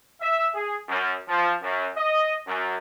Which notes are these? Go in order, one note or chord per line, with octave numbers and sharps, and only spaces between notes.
E5
G#4
F#2
F3
F#2
D#5
F#2